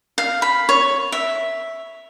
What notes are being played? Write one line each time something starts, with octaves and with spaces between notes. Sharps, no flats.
F5
B5
C#5
E5